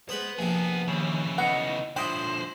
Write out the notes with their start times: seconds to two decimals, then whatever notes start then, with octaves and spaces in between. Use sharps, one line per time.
0.09 G#3 B3 B4 C5
0.39 A#1 C3 F3 A#3 G#4
0.88 D#2 C#3 E3
1.38 B3 D#4 F#5 A#5
1.96 D3 F3 E4 C5 D#5 G5 B5 D#6